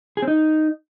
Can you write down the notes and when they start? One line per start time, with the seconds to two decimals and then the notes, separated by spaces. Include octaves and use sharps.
0.17 G#4
0.22 C4
0.28 D#4